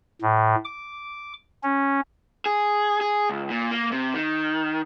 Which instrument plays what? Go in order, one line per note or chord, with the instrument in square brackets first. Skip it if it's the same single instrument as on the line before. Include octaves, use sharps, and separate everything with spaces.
[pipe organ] A2
D6
C#4
[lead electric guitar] G#4
G#4
C#2
A#2
A#3
C3
D#3